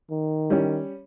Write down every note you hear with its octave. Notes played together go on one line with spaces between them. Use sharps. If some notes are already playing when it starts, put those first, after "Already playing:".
D#3
G3 C#4